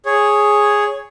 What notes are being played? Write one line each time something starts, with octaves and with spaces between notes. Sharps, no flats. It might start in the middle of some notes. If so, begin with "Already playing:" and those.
G#4 C#5